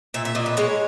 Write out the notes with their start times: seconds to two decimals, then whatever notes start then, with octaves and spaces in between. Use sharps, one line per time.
0.14 A#2 E5
0.25 E5
0.35 A#2 D#5
0.46 B4
0.57 G#3 C#5